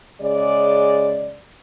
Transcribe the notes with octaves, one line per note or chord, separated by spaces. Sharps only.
C#3 G#3 D5